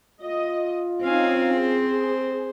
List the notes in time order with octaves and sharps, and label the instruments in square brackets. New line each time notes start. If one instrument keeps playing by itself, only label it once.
[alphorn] F4 [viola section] D#5
[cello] C4 [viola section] C#4 D#4 [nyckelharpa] F5 G#5
[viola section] G#4 [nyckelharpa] C5